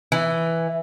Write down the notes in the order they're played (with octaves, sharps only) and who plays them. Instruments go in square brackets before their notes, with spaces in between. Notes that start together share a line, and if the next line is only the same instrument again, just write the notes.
[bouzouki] E3